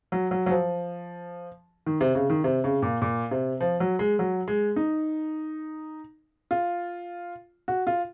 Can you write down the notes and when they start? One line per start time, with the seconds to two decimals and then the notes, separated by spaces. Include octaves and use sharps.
0.12 F#3
0.31 F#3
0.46 F#3
0.51 F3
1.86 D#3
2.01 C3
2.15 C#3
2.30 D#3
2.44 C3
2.64 C#3
2.82 A#2
3.02 A#2
3.31 C3
3.61 F3
3.80 F#3
3.99 G#3
4.19 F#3
4.48 G#3
4.76 D#4
6.51 F4
7.68 F#4
7.87 F4